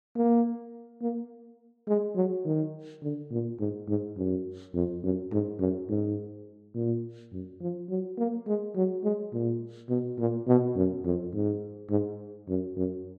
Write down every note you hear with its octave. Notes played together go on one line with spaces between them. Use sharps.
A#3
A#3
G#3
F#3
D#3
D3
A#2
G#2
G#2
F#2
F2
F#2
G#2
F#2
G#2
A#2
F#2
F3
F#3
A#3
G#3
F#3
G#3
A#2
B2
A#2
B2
F#2
F2
G#2
G#2
F#2
F#2